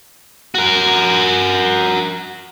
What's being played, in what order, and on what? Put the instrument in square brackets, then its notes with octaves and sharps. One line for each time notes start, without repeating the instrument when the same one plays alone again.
[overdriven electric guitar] F#4 A#4